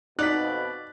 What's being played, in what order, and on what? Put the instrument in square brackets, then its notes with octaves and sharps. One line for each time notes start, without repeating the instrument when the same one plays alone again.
[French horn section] F2 B2 [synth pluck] D#4 [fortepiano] D5 [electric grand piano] F#6 B6